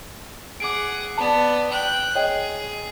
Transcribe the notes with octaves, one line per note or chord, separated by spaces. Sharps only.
G#4 F#5 D6 D7
B3 D5 A5
G5 F#6
G#4 C#5 D#5 G5